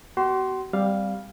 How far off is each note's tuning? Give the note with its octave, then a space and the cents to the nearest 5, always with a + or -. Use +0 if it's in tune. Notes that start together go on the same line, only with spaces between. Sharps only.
B3 +0 F#4 +40 C6 +0
G3 +0 C4 -10 F5 +0